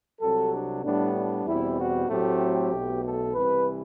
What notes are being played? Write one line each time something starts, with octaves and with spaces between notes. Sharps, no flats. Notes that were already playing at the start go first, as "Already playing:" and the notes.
C2 C3 F#3 A4
D4
A2 G3 B3 D4
D4
E2 B2 G3 C4 E4
F#4
A2 F#3 A3 C4 G4
B1 B2 A3
A4
C2 C3 E3 B4